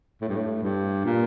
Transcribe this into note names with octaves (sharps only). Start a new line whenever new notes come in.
A2
G2
A2
G2
A#2